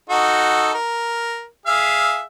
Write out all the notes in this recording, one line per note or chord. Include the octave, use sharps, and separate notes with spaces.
D#4 F#4 A4
A#4
G#4 E5 F5